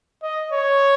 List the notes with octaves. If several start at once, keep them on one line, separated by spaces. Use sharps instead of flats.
D#5
C#5